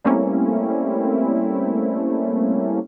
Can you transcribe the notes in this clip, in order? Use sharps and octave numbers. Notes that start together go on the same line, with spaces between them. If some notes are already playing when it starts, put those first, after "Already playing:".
G3 A3 A#3 C4 C#4 E4